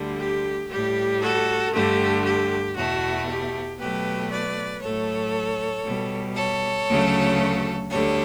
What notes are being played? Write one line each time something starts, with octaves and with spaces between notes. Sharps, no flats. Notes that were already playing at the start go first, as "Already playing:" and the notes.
Already playing: D2 D3 G3
G4
A2 G3 G4
F#4 A4
G2 D3 A3 G4
G4
E2 B2 A3 F#4
G4
B2 F#3 A3 G4 B4
B4 D5
A2 F#3 A3 A4 C#5
B2 G3
A4 C#5
D2 C#3 F#3 A3
D2 D3 G3 A4 C#5